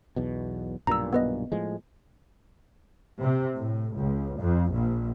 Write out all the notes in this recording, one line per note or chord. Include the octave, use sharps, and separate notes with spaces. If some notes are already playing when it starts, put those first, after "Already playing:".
B1 E2 B2
B1 G2 A#2 A#5 E6
B3 B4 D#5
A2 F3 G#3
C3
A2
C#2
F2
A#1